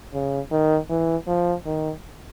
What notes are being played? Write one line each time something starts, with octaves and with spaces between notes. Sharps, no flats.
C#3
D#3
E3
F3
D#3